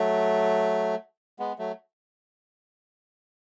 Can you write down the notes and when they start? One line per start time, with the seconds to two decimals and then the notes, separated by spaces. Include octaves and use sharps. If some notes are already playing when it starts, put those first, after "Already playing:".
Already playing: F#3 A3
1.39 G#3 B3
1.59 F#3 A3